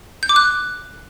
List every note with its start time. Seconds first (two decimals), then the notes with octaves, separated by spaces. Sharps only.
0.23 G6
0.29 D6
0.36 F#6